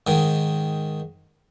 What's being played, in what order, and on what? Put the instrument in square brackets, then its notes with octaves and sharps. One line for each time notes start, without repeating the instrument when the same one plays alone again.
[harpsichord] G#2 D#3